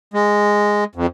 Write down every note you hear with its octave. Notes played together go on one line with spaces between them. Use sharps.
G#3
F2